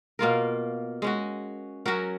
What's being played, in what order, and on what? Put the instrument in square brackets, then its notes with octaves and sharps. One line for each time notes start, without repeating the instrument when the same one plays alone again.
[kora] B2 A#3 F4 A#4
G#3 C#4 F#4
F#3 C#4 F#4 A#4